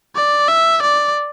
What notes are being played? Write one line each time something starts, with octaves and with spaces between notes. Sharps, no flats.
D5
E5
D5